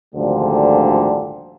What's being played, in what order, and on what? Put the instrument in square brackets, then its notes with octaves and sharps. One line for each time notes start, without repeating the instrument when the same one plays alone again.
[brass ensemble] G#1 D2 A#2 D3 F3 G3